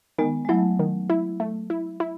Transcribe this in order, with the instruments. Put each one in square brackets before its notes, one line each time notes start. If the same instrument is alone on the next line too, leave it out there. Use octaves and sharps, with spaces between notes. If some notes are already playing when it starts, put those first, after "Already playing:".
[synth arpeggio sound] D#3 [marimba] G#3 B3
[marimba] G#3
[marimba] F#3 A3 [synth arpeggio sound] E4
[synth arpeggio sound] D#3
E4
A3
E4
E4